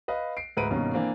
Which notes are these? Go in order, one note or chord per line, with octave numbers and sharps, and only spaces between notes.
B4 D#5 F5
C7 D7
D2 G#2 B4 A#5 D7 D#7
G2 B2 D#3 A#3 C#4
E3 A#3 C4 D4